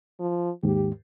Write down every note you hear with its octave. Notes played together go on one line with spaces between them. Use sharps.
F3
D#2 G#2 G4